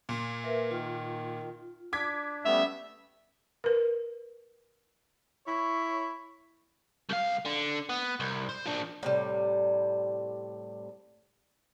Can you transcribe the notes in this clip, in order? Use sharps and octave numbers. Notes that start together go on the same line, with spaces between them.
A#2
A#4 B4 E5
D#3 F4
D4 D6 G#6 B6
G3 A3 B3 C#4 E5
A#4 B4
E4 C#5
C2 F5
D3
B3
C2
C5
F3 D4
A2 C3 G3